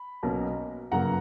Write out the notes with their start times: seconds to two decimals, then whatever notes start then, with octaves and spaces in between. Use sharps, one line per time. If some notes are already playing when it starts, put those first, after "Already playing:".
Already playing: B5
0.23 B1 B2 A#3 C#4
0.91 G1 F#2 C#3 F#3 A#3 F#5 A#5